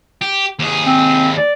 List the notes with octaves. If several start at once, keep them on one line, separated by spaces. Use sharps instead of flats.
G4
D#2 G#4
C4
D5